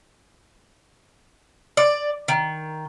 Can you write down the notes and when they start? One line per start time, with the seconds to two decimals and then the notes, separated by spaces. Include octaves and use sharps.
1.77 D5
2.28 D#3